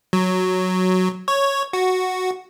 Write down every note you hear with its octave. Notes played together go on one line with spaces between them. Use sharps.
F#3
C#5
F#4